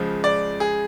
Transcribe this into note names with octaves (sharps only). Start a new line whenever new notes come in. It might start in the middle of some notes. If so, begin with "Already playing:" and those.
Already playing: C#2 C#3 F3
D5
G#4